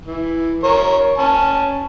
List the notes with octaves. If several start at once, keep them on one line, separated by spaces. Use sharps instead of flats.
E3
A#4 C#5
C#4 A5